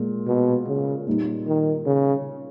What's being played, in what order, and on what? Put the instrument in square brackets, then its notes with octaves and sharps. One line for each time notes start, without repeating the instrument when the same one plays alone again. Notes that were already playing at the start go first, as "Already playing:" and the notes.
Already playing: [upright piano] A#2 G#3
[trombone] B2
C#3
[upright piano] A#2 G3 A#3 D#4
[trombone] D#3
C#3